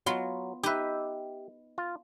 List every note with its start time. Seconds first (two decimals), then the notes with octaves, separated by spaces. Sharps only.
0.06 F#3 B3 F4 C6
0.63 D#4 G4 B4 E5
1.78 F4